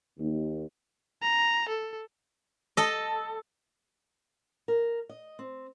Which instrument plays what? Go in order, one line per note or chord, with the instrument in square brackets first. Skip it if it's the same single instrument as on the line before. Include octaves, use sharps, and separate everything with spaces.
[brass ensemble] D#2
[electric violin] A#5
A4
[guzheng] A4 D#5
[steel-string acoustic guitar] A#4
D#5
C4